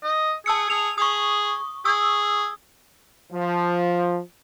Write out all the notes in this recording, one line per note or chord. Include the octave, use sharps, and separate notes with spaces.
D#5
G#4 A5 E6 C#7
G#4 F7
G#4 C#6 D#6
G#4 C#6 D#6 E6
F3